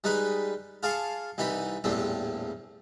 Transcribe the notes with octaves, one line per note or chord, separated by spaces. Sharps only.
G3 G#3 D#4 B4 B5
F4 G#4 F5 A5 C#6 D6
C2 E3 D#4 G4 B5
A#1 E2 A2 G3 C4